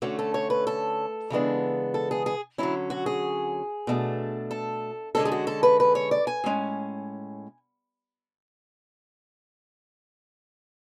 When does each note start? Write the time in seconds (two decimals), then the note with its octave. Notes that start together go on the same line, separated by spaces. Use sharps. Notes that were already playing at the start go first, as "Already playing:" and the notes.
0.02 D3 A3 C#4 F#4
0.19 A4
0.34 C#5
0.50 B4
0.67 A4
1.30 C#3 E3 G#3 B3 D4
1.94 A4
2.11 G#4
2.26 G#4
2.58 D3 F#3 C#4 E4
2.90 F#4
3.06 G#4
3.87 B2 A3 D4
4.51 A4
5.15 D3 G#3 C#4 A4
5.25 G#4
5.32 F#4
5.47 A4
5.63 B4
5.80 B4
5.95 C#5
6.11 D5
6.27 G#5
6.44 A2 G#3 C#4